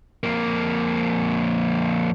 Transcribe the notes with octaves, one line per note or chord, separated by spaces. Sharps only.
F2 A#3